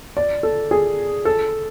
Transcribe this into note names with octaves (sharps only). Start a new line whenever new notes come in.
D5
A4
G#4
A4